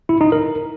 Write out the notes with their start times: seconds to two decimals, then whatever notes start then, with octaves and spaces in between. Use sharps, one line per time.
0.09 E4
0.21 D#4
0.32 A#4